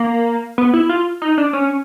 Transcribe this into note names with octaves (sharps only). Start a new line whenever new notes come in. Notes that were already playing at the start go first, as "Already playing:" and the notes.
Already playing: A#3
B3
E4
F4
D#4
D4
C#4